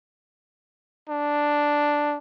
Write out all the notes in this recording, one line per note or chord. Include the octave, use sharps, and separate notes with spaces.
D4